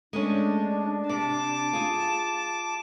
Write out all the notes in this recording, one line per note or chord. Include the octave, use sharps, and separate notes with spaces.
G#3 A3 C#4 D4
C3 A5 D6
F4 G#4